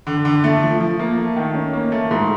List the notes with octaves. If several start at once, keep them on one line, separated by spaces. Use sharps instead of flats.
D3
D3
A3
F3
F3
A#3
A3
D#3
C#4
A#3
A3
G#2